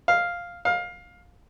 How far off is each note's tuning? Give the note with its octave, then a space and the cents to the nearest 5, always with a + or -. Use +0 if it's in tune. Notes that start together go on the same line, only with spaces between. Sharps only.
F5 +0
F5 +20